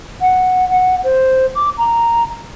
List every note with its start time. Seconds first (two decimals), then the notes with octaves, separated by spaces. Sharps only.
0.21 F#5
0.70 F#5
1.04 C5
1.55 D6
1.78 A#5